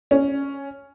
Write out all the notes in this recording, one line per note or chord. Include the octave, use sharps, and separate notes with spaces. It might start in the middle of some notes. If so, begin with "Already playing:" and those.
C#4